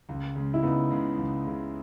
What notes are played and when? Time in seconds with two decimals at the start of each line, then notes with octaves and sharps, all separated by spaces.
0.09 C#2
0.36 C#3 G#3
0.54 E4
0.63 C#2 B3 D#4
0.90 C#3 G#3
1.17 C#2
1.44 C#3 G#3